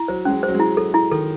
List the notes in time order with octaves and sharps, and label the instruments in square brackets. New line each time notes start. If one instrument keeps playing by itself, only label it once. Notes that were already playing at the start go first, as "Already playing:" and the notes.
Already playing: [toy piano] E4
[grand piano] F#3 [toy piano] C5
[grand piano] G#3 [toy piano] C#4
[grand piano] F#3
[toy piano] C5
[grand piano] F#3
[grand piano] G#3 [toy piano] E4
[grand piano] F#3 [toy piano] A4
[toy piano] E4
[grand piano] D#3 [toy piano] A4